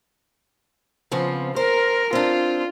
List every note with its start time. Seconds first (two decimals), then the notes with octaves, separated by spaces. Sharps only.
1.12 C#3 F3 B3 C4
1.56 A#4 C5
2.13 C4 D4 F4